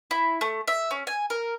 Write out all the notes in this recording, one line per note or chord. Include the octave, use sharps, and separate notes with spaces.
E4
A3
E5
C#4
G#5
A#4